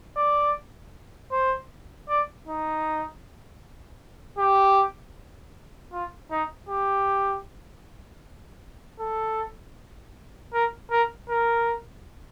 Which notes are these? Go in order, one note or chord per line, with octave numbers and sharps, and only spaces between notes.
D5
C5
D5
D#4
G4
F4
D#4
G4
A4
A#4
A#4
A#4